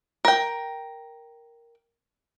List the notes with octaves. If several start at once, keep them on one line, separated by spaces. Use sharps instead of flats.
A#4 G5